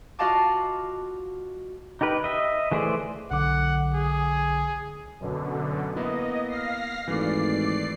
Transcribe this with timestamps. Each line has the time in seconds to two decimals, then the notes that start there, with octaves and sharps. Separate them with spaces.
0.19 F4 F#4 D#5 F5 A5 D6
2.01 D#4 G4 A#4 B4
2.24 D#5 E5
2.72 E3 A3 G#4 C5 D5
3.31 B1 D3 F#5 D6
3.94 G#4
5.20 F#2 B2 D3
5.96 A#3 B3 E4 D#5
6.49 F5 A#6 C7
7.08 G#1 E3 A3 D5 C7